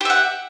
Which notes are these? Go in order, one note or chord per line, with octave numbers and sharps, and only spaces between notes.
G4 E5 F#5